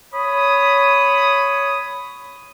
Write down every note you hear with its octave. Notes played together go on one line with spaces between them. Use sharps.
C#5 B5 D#6